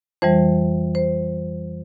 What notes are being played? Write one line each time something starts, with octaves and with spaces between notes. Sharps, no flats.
F2 E3 G3 C5
C5